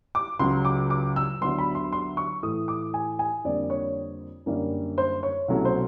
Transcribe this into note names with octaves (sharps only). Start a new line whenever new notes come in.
D6
C#2 C#3 F#3 C6
D6
D6
E6
D2 D3 F#3 B3 C6
B5
C6
C6
C#6
A2 E3 A3 D#6
D6
G#5
G#5
F2 D3 G3 A#3 D5
C#5
F#2 D3 G3 A#3 C#4
C5
C#5
C2 B2 F#3 A3 C#4
C5